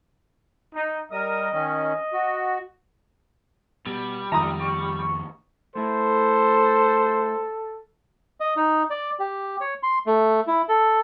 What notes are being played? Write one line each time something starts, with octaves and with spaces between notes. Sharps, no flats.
D#4
G3 A#4 D#5 D#6
D#3 C#4
F#4
B2 G3
F2 D#3 E5 A#5 D#6
C#6
A3 E4 A4 C5
D#5
D#4
D5
G4
C#5
C6
A3
E4
A4